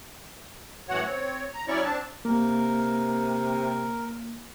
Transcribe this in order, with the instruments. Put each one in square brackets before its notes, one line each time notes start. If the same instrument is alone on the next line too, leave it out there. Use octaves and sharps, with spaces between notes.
[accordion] F#2 A2 E3 F#4 C#5 F#5
C4 C#5
A#5
F#3 C#4 E4 C#5 D5 C#6
C4 D4 A5
[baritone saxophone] C3 [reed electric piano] A#3 [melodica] A#4